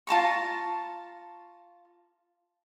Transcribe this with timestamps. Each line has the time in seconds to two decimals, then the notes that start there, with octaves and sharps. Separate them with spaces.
0.07 F4 A5 A#5 C#6